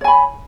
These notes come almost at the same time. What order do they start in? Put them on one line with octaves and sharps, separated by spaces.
C#5 G#5 B5